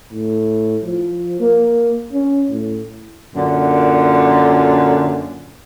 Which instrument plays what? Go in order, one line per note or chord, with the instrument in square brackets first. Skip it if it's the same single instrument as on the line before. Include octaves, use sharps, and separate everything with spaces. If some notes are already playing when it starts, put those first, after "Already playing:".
[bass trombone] A2
F3
A#3
C#4
A2
[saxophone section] F#2 A#2 D3